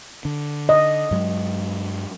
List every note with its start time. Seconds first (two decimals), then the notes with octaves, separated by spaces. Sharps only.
0.25 D3
0.69 D#5
1.11 G2 F#3 G#3